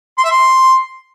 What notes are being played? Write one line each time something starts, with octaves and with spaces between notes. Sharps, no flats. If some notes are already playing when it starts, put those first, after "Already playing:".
C6
E5
C6